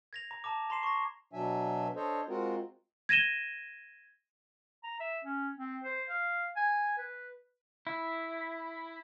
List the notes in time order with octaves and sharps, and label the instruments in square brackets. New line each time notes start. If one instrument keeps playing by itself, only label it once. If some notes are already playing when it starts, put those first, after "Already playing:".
[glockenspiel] G#6 A#6 F7
A#5
A5 A#5 D6
A#5 C6 C7 E7
C#6 A#6
[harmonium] B2 F#3 D4 E5 G#5
D4 A4 C5 C#5 D#5
G#3 C4 F4 F#4 A#4
[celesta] G#6 A#6 D#7 E7 G7
[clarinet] A#5
E5
C#4
C4
C5
F5
G#5
B4
[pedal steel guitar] E4